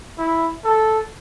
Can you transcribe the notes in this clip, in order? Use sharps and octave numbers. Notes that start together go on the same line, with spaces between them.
E4
A4